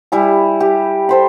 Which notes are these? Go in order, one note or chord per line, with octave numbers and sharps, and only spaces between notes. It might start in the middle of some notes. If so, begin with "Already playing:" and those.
G3 E4 G#5
G4
A4 C5 B5